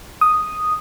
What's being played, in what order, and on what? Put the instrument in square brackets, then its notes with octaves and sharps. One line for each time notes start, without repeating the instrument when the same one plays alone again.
[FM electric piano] D#6